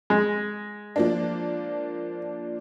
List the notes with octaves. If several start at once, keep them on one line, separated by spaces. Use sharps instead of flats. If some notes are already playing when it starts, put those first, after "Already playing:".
G#3
F3 A#3 D4